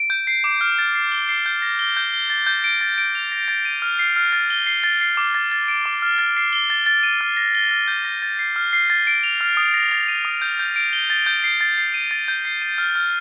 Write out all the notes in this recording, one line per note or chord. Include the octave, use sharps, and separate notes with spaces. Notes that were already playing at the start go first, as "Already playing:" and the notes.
Already playing: D7
G6
C7
D6
F6
A6
C7
G7
C7
G6
A#6
G7
G6
G7
A6
G6
D7
A6
D7
F7
A#6
A6
D#7
F6
C7
F6
A6
G7
C7
A6
C7
D6
A6
A6
D7
D6
F6
A6
C7
G7
A6
A6
D#7
F6
A#6
G7
F6
G6
A#6
A6
C7
F6
C7
A6
D7
F7
F6
D#6
A#6
A6
D#7
D#6
G6
G6
D7
G7
A6
G6
C7
A6
C7
D#7
A6
G6
C7
D#7
F6
F6